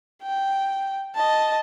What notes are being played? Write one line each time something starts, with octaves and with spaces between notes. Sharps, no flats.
G5
D#5 A5